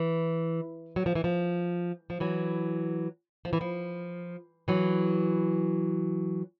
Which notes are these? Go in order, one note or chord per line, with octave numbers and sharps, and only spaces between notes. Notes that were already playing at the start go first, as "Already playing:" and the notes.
Already playing: E3
F#3
F3
E3
F3
F3
E3 F#3
F3
E3
F3
E3 F#3